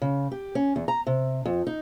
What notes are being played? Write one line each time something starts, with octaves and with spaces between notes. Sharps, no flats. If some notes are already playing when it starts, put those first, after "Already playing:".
C#3
G4
C#4
E2
A#5
C3
F2
D#4